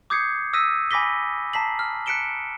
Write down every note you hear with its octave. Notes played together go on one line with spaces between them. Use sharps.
D6 D#6 G6 G#6 C7 C#7
D#6 E6 F#6 A#6 B6 D#7
G#5 B5 D6 A#6 B6 G7
A5 A#5 B6 C7 F#7
F6
F#6 B6 C#7 D7 E7 G7